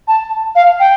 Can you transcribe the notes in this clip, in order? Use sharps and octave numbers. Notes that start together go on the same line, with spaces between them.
A5
F5
G5